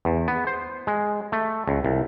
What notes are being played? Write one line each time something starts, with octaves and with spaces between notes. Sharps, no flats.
E2
B3
C5
G#3
A3
C#2
C2